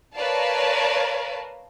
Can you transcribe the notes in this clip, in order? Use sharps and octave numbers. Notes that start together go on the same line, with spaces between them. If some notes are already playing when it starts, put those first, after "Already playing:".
A#4 B4 C#5 D5 F5 A5